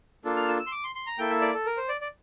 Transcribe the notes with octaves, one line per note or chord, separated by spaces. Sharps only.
A#3 D4 F4 A4
F6
E6
E6
C6
D6
C6
C6
A#5
A#3 E4 A4 G5
E5
D5
A4
A#4
C5
D5
D5